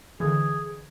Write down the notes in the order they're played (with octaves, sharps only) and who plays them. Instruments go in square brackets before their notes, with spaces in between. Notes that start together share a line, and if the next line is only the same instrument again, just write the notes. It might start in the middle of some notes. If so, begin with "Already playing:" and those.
[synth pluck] D3 E3 [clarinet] G#4